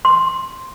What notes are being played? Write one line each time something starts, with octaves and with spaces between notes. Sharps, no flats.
C6